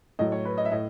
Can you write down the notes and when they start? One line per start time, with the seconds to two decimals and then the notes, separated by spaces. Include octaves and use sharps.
0.19 A2 F#3 D#5
0.32 C#5
0.45 B4
0.58 D#5
0.65 E5
0.72 A2 D#5